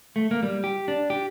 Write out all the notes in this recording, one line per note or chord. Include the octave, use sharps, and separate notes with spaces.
A3
A#3
G3
G4
D4
G4